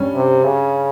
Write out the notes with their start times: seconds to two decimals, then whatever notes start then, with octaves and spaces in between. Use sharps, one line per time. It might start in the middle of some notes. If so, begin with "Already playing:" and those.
Already playing: G2 G3 C#4
0.14 C3
0.44 C#3